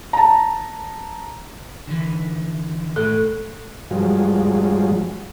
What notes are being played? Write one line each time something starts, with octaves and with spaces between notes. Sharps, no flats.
A5 A#5
D3 E3
A2 A4
G2 F3 F#3 G#3